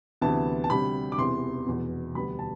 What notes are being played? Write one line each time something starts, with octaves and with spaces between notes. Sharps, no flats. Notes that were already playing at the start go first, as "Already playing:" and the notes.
D2 C3 E3 B3 A5
A5
D2 C3 G3 B5
D6
E1 E2 C3 E3 C6
F1 E2 B2
E1 D2 D3 G3 B3 B5
A5